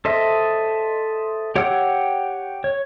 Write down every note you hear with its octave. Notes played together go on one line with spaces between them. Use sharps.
A4 C5 D#5 E5
G4 C#5 F#5 G5 E6
C#5